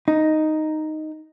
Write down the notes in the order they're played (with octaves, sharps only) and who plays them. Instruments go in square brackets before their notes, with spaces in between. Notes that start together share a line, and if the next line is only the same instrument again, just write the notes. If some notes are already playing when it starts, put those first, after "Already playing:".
[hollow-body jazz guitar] D#4